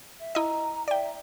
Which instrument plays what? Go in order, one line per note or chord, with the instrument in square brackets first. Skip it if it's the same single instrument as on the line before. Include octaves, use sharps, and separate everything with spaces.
[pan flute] E5
[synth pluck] E4 D#5 [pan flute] A#5
[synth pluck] D5 G5 [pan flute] E5